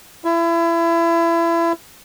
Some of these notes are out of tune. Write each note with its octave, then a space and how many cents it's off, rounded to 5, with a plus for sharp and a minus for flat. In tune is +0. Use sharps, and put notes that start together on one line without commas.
E4 +30